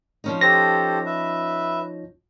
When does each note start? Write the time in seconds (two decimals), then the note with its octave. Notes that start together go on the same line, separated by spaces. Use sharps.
0.24 F3 C#4 D#4
0.41 G4 A4 C5 A#6
1.06 B4 E5